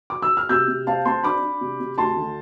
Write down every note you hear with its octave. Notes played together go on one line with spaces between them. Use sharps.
D6
E6
F6
C3 E6 G6
C3
C4 F5 A5
C4 A5 C6
D4 B5 D6
D4
C3
C3
D2 A5 C6
D3